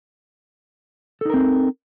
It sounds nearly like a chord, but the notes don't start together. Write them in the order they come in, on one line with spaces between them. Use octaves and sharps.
A4 D#4 A#4 C4